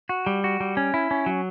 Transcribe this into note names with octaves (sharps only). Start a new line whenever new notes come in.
F#4
G3
F#4
G3
C#4
E4
C#4
F#3